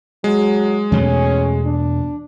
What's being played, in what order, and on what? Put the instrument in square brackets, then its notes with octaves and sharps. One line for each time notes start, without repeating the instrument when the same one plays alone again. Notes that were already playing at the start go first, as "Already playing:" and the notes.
[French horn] F#3 [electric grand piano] G#3
[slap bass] E2 B2 A3 [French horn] C#4
[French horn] D4